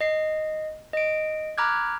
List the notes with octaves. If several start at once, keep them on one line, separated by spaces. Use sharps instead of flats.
D#5 C7
D#5 D7
A#5 B5 D6 F6 F#6 G#6